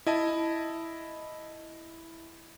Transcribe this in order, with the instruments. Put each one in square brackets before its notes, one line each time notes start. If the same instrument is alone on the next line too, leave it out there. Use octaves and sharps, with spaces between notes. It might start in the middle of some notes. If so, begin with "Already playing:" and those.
[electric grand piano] E4 D#5 A5